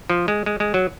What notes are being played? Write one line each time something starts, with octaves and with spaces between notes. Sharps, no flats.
F3
G#3
G#3
G#3
F#3